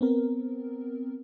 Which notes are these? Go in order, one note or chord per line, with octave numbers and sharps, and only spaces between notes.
B3 C4 A#4